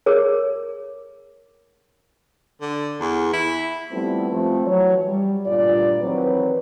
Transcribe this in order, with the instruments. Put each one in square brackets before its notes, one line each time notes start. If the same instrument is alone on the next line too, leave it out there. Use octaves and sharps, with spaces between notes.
[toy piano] G#4 A#4 C#5
[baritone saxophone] D3
E2
E4
[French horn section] F3 G3 A3 B3 C4 E4
F3 A3 C4
E3 F#3 C#5
G3
D2 G2 A#2 F4 D5
D#3 E3 F#3 C4 B4 C#5